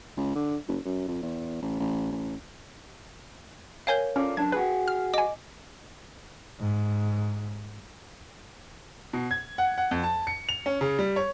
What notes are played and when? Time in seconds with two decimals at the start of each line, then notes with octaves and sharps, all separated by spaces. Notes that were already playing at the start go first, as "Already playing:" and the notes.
0.17 C#2
0.35 D3
0.68 F#1
0.85 F#2
1.08 F2
1.22 E2
1.62 A1
1.80 A1
2.12 A1
3.87 A#4 C#5 F5 G5 G#5 G6
4.16 C#4 F4 A4 D5
4.37 F#2 D4 A5 G#6
4.52 F#4 G#4 B4
4.88 F6
5.14 D#5 G#5 D6
6.59 G#2
9.13 B2
9.31 G#6
9.58 F#5
9.78 F#5
9.91 F2
10.03 A5
10.27 C#7
10.49 F7
10.66 C#4
10.81 C#3
10.99 G3
11.16 C#5